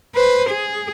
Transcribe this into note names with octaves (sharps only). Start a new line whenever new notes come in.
B4 C5
G#4